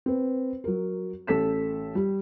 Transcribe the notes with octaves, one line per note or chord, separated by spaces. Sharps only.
C4 B4
F#3 A#4
A1 A4 B6 E7
G3